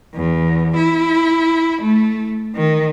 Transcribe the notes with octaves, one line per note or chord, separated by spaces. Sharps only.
E2
E4
A3
D#3